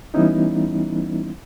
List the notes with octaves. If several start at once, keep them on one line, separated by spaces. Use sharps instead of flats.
E3 G3 B3 C#4 D#4 E4